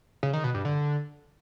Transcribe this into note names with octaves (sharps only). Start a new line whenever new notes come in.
C#3
D#3
B2
G2
D3